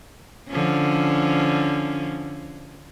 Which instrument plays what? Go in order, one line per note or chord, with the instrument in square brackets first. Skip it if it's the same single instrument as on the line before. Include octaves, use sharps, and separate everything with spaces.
[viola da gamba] D3 F3 C#4